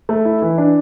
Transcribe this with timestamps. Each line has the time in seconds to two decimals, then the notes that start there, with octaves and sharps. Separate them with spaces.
0.09 A3
0.25 E4
0.42 E3
0.58 D4